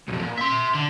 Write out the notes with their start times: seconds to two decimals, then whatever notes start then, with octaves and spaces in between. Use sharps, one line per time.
0.08 B1 F2
0.21 A#2
0.38 E5 C6
0.75 D3